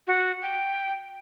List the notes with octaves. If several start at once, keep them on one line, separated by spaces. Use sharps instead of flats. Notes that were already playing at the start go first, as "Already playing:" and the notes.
F#4
G5